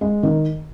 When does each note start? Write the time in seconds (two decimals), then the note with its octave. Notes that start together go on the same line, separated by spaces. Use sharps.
0.01 G#3
0.23 D#3